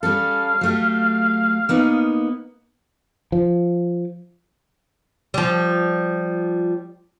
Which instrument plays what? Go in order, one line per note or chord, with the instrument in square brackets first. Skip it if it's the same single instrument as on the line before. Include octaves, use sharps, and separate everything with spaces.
[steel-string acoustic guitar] G3 C#4 A4 [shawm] F5
[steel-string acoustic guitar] F#3 A3 G4
A#3 B3 D#4
[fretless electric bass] F3
[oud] F3 G3